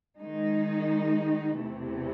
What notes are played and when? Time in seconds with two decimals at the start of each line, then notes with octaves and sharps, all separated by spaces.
0.21 D#3 G#3 D#4
1.61 E2 C3 E3 A3